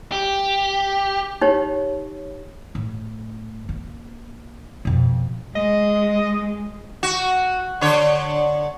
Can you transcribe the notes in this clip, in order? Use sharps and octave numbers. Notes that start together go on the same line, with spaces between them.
G4
D#4 G4 C#5
A2
A#3
F2 B2
G#3 D#5
F#4
D3 C#5